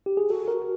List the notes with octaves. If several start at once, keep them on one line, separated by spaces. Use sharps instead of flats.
G4
G#4
F#4 A4
A#4